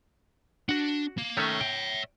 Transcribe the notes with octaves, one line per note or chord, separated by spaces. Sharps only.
D4 F#4 F#5
A#3
D#3 A3 C#4 C#5 E5
G5